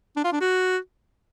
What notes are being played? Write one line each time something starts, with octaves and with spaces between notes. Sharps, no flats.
D4
F4
D4
F#4